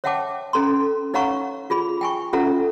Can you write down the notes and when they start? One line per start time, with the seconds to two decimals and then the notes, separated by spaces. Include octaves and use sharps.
0.04 C#5 E5 F#5 G5 A5 D6
0.53 C#4 A4 A#5 C6
1.14 D#4 C#5 F5 F#5 A#5 C#6
1.70 F4 G#4 B5
2.01 G5 G#5 C#6
2.33 C#4 F4 A4 E5 F#5 A#5